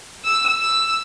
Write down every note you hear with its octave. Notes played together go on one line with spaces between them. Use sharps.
E6
E6